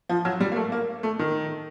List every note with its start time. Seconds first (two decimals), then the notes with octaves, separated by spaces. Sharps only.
0.09 F3
0.25 F#3
0.40 G3
0.52 A#3
0.56 A3
0.72 A#3
1.03 A3
1.19 D#3